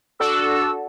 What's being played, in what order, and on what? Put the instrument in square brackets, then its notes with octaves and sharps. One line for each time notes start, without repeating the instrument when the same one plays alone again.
[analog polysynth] D4 F#4 A4 [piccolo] E6